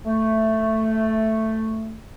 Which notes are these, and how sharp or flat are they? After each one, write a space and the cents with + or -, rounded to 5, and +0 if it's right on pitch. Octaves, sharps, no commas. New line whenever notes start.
A3 +5